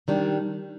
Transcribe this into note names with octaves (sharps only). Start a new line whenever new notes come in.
D#3 G3 D4